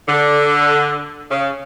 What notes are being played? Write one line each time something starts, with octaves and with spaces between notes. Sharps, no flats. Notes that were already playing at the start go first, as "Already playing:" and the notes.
D3
C#3